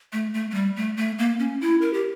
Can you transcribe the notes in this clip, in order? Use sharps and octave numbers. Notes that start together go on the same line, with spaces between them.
A3
A3
A3
G3
A3
A3
A#3
C#4
E4
A#4
G4